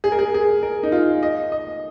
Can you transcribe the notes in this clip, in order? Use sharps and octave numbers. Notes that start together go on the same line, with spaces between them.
G#4
A#4
G#4
G#4
A#4
D#4
F4
D#5
D#5